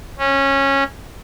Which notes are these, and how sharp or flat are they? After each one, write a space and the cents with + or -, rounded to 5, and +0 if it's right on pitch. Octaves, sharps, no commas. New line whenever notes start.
C#4 -15